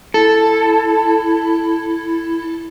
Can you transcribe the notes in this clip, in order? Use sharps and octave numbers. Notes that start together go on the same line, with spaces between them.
E4 A4